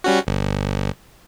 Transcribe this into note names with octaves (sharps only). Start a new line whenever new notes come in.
G3 C#4 F#4
G1